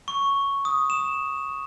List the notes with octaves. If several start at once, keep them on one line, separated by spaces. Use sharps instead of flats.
C#6
D#6
E7